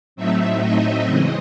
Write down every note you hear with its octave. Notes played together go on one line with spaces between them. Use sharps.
A2 F#3 A3 C4 D#4 E5
D#5
C#3 E3 G#3 C4